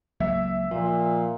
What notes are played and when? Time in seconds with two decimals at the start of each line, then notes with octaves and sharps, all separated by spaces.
0.20 C#2 F#3 A#3 E5
0.71 A#2 F3